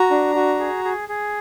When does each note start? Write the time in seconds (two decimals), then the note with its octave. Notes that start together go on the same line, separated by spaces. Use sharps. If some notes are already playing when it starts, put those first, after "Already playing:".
Already playing: F#4 A#5
0.11 D4
0.35 F#4
0.59 G#4
0.85 G#4
1.09 G#4